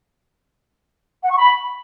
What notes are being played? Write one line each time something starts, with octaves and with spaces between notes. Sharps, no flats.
F#5
C#6
B5